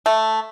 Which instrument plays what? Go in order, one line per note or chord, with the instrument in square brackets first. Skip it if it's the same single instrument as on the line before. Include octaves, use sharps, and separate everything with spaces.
[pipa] A3